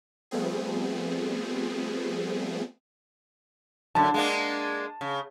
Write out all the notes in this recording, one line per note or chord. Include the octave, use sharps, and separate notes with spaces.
F3 G3 A3 B3 C4 G#4
F#2 D3 A5
G#3 A#3 D4
C#3